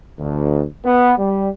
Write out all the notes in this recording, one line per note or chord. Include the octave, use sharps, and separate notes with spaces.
D2
B3
G3